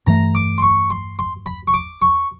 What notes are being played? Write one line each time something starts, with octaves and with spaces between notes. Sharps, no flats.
G2 E3 A3 A#5
D6
C6
C#6
C6
C6
B5
C#6
D6
C#6